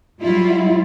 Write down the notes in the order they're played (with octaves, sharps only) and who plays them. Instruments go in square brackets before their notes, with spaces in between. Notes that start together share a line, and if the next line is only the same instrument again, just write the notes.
[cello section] F#3 G3 E4 F4